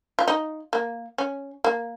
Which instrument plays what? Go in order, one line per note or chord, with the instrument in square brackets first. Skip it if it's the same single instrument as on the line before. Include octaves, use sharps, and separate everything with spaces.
[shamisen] F4
D#4
A#3
C#4
A#3